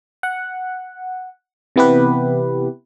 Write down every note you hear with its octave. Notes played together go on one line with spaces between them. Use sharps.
F#5
C3 E3 B3 E4 G4 B4